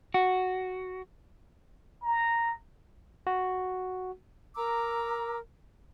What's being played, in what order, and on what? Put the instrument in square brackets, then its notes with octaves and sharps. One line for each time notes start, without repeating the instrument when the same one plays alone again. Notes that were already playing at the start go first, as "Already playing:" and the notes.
[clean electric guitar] F#4
[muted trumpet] A#5
[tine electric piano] F#4
[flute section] A#4 A#5 D6 E6